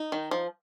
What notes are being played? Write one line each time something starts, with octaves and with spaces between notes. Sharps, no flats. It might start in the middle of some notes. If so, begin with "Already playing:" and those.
Already playing: D#4
D#3
F3